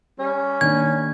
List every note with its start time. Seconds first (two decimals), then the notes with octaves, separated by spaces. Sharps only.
0.19 G3 C#4
0.61 D#3 A#3 D4 G#6